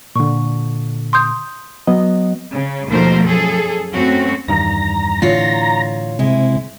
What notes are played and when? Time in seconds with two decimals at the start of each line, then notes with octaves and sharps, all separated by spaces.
0.15 A#2 D3 C#6
1.13 C6 D#6 G6
1.87 F#3 B3 D#5
2.55 C#3
2.90 D#2 B2 F3 A3 A#4 C5
3.25 F#2 G#4 A4
3.93 F#2 A3 C4 C#4 F#4
4.48 E2 G2 D#3 A#5
5.22 A2 D3 E3 F4 C#5
6.19 C3 G#3 E4